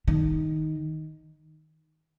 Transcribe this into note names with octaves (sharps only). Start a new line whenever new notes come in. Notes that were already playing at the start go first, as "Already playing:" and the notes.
D#3